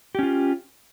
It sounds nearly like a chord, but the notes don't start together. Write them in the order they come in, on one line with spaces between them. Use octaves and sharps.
G4 C#4 F4